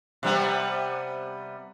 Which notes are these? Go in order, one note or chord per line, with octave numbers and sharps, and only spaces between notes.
C3 G3 B3